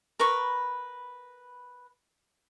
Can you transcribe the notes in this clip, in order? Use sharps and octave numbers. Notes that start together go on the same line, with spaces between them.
A#4 B4 B5 C#6